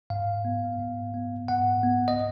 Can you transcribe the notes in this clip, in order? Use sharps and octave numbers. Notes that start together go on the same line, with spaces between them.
G#2 F5
B3
G#2
B3
G#2 F#5
B3
D#5